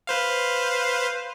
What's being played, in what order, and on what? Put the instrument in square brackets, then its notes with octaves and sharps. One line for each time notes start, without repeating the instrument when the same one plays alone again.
[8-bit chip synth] B4 C5 F5